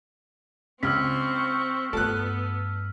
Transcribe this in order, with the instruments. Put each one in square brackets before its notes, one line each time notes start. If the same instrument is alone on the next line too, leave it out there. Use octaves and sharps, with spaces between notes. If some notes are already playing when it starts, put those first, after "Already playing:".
[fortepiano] C#2 [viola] C4 C#6 [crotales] E6 F6 B6
[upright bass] G2 A3 [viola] B3 [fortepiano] A4 F#6